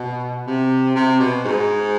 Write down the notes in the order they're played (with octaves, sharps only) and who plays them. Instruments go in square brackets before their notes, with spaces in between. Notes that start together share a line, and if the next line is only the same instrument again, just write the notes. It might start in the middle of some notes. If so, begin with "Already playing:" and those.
Already playing: [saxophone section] B2
C3
C3
B2
G#2